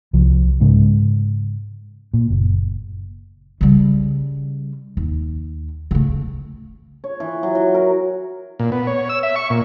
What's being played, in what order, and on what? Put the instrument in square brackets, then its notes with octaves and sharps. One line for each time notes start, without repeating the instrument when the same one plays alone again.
[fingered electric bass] C2 F3
G#2 C#3 G#3
A#2
F#1
[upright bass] C#3 G3
D#2
C#3 A3
[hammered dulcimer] C#5
E3
F#3
F#3
A#4
[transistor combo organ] A#2
B3
C#5
E6
E5
C#6
A#2